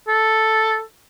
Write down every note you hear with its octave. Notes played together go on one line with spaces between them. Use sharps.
A4